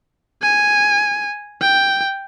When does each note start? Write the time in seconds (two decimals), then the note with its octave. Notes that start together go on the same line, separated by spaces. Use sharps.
0.42 G#5
1.61 G5